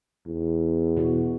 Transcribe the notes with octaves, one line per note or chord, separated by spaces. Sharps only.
E2
B2 E3 F#4